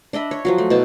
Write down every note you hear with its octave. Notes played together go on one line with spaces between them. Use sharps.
D4 D#5 E5 B5
C#5
F3 F#3 F#4
A3
B2 E4 A5